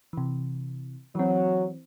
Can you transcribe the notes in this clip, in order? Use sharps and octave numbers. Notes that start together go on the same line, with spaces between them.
C3 E3
E3 F#3 C4